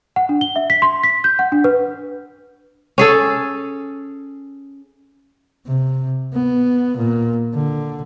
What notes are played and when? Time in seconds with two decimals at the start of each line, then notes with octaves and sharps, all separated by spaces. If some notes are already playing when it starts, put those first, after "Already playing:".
0.16 F#5
0.29 D4
0.41 G7
0.56 E5
0.70 B6
0.82 C6
1.03 B6
1.24 G6
1.39 F#5
1.52 D4
1.64 B4
2.98 C#4 G#4 A4
5.66 C3
6.34 B3
6.97 A#2
7.54 D3